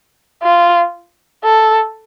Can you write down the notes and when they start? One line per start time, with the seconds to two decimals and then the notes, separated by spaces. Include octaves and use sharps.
0.43 F4
1.44 A4